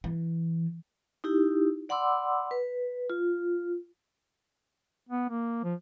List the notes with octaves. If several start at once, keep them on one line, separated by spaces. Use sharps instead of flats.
E3
D#4 E4 G4
D5 F#5 B5 C6 D6 E6
B4
F4
B3
A#3
F3